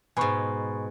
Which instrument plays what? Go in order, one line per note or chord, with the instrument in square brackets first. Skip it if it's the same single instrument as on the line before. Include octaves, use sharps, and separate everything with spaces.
[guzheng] G#2 B2 [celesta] G#5 B5 C#6